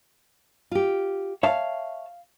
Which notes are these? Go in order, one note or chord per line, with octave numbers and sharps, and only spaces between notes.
F4 G4
C#5 E5 F5 A5